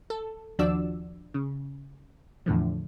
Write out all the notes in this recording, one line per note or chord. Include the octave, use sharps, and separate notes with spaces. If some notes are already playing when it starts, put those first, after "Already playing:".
A4
D#2 F3 D4 F#4 D5 E6
C#3
E2 A2 D3 F3